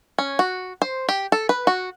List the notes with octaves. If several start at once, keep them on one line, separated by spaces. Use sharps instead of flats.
C#4
F#4
C5
G4
A4
B4
F#4